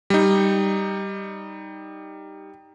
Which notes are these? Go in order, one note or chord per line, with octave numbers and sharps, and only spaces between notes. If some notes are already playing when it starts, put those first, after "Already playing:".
G3 D#4